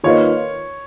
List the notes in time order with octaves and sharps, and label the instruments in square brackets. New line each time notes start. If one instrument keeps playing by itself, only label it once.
[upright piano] D#3 A#3 F4 B4 D#5 [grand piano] C#5